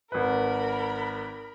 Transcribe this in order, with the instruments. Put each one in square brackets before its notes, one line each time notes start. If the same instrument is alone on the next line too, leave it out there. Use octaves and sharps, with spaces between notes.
[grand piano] G#1 B4 [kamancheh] A#4 B5